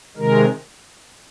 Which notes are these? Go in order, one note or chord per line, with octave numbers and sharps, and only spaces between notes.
C3 D#3 G#3 A#4